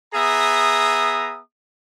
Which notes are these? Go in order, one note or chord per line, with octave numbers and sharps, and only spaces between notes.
B3 G#4 E5 A#5 D#6